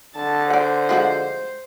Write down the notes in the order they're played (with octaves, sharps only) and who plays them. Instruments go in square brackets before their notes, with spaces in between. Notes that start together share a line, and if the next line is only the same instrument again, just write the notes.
[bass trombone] D3 [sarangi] A5
[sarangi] C5 [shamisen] D5 F#5
[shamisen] F3 G#3 F#4